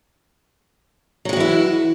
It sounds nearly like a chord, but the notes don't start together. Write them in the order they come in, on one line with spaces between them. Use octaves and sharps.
F#3 G#3 F#4 E3 E4